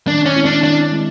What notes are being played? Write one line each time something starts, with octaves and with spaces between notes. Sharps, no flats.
D#3 D4
C#4
G#3 C4 E4
D4
D#3 D4
G#3 C4 E4